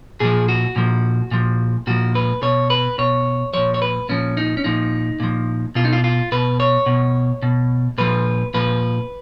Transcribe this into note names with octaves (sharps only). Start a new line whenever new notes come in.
A#2 F3 G#4
F#4
A#2 F3
A#2 F3
A#2 F3 F#4
B4
B2 C#5
B4
B2 C#5
A#2 F3 C#5
C#5
B4
A#2 F3 C#4
D#4
C#4
A#2 F3 D#4
A#2 F3
B2 F4
D#4
F4
F4
B2 B4
C#5
B2
B2
A#2 F3 B4
A#2 F3 B4